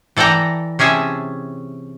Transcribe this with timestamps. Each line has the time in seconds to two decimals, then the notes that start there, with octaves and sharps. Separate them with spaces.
0.17 E3 A4 D5 G5 A#5
0.79 C3 C#4 G#4 E5 A5